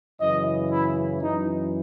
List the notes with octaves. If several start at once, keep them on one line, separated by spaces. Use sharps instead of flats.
F#2 C#3 E3 D#5
E4
F#2 E3 D#4